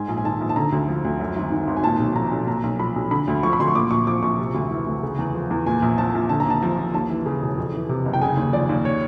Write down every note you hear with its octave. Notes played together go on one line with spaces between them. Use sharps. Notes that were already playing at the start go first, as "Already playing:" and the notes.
Already playing: G#2 G#5
A#1
G#5
D#3 A5
A#1
A5
D3 A#5
D2
F3
D2
F#2
G#1
D#3
G#1
G#5
A#2 A5
B1
F3 A#5
B1
A#2 A#5
B1
F3 B5
B1
D3 B5
D2
F3 C#6
B5
D2 C6
C#6
A#2 D6
A#1 C#6
F3 D6
A#1 C#6
C3
D2
E3
D2
C#3
E2
F3
E2
A#2 G#5
A#1
F3 A5
A#1
D3 A5
A#5
D#2 A5
F3 A#5
D#2
D#2 A5
E3
C#3
E1
F2
E3
C3
F#1
G5
C#3 G#5
D#2
F3 D5
D#2
C#5